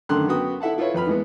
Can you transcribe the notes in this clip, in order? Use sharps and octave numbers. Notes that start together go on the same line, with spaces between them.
F#2 D3 D#3 A3 C6 F#6
F#2 B3 F#4 G5 D#6
E4 A4 E5 F#5 A5
E4 F4 A4 B4 C#5
F2 B4 B5 F6
E3 G#3 B3